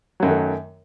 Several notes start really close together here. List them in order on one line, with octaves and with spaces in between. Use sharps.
F#3 F#2 D#3 A3